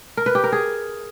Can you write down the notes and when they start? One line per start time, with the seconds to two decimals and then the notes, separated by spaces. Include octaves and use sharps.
0.17 A#4
0.26 B4
0.35 G4
0.44 A#4
0.52 G#4